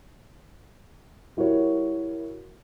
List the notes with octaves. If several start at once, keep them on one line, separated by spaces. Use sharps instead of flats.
G3 E4 F#4 A#4 C#5